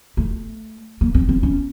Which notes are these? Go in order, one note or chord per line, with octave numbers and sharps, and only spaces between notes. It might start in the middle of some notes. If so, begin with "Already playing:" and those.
A3
A#3
C4
C4
C#4